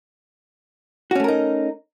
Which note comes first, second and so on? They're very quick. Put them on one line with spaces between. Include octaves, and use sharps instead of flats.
F#4 C#4 A3 A#4 D#4